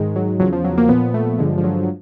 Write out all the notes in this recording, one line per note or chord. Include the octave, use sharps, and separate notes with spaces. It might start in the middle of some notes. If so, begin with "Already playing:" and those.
Already playing: G#2 D#3 G#3
F#3
E2 C#3 F3 F#3
F3
F#3
A#3
A#2 F3 B3
A3
G2 D3 F3 G#3
F3
F#3
F#3